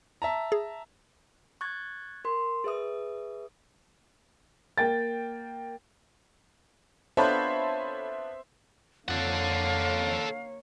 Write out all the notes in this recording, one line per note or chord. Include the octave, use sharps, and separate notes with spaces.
E5 A5 A#5
G#4
C#6 F#6 G#6 A6
A#4 C6
G#4 B4 E5 D#6
A#3 G5 A6
B3 D4 F4 A4 C5 C#5 E5 B5
F2 A#3 A4 C#5 F5 F#5